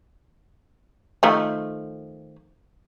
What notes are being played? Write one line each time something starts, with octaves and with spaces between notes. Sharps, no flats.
D#3 F3 A3